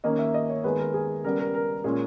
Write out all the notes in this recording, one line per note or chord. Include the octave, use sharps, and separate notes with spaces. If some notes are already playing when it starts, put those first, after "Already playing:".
D#3 A#3 C#4 D#5
E5
D#5
C#5
D#3 G#3 B3 B4
A#4
G#4
C#3 G3 B3 A#4
A#4
A#4
A#2 G#3 C#4 G#4